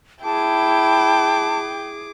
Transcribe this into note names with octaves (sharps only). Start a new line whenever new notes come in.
E4 G#4 G5 A5 D6